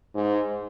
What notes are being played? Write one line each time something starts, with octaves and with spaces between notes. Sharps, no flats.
G#2